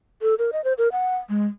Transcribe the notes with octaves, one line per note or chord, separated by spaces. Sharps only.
A4
A#4
D#5
C5
A#4
F#5
G#3